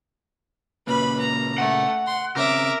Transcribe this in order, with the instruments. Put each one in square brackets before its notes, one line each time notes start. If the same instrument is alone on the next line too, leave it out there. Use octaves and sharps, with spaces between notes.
[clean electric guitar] A#2 C#3 A#3 [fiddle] B4 B5
[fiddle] A#5
[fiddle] A3 [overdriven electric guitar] F#5
[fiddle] C6
[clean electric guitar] C#3 C4 [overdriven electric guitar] A#4 [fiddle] E5 D6